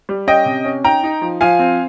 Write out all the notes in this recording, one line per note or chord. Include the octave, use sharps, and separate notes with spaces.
G3
C#4 D#5 G5
C3
C#4
D#4 G5 A#5
D#4
F3
F3 F5 G#5
C4